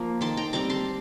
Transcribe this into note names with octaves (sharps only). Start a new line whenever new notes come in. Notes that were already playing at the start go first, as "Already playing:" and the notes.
Already playing: F3 A#3
D#3 A5 C6
G5 A#5
G3 C4 A#5 D6
A5 C6